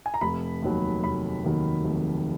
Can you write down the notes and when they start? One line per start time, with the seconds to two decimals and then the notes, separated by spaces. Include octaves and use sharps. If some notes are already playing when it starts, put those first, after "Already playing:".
0.06 G#5
0.14 A#5
0.21 F1 B5
0.62 D#2 D#3 F#3
1.03 F1 B5
1.44 D#2 D#3 F#3
1.84 F1